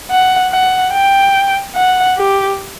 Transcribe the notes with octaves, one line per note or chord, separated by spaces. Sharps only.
F#5
F#5
G5
F#5
G4